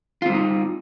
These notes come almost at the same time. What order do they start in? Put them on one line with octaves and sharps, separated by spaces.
F4 C4 G3 D#4